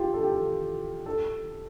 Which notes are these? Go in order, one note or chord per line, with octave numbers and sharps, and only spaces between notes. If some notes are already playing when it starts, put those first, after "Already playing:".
Already playing: F4 G4
A4
G4
A4
A4